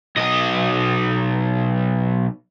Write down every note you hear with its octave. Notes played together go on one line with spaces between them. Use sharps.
B1 D#5